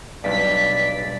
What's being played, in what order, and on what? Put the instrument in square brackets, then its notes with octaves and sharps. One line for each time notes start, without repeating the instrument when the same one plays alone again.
[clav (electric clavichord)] B1 G2 [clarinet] D5 [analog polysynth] B6